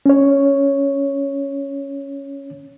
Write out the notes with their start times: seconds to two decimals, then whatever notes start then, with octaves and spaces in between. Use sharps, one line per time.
0.06 C#4 C#5